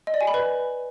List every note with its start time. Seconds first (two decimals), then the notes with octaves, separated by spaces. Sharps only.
0.07 D#5
0.14 D5
0.21 G#5
0.27 B5
0.34 B4